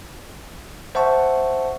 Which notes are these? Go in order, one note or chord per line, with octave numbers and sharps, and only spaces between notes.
C5 E5 F#5 A5 C#6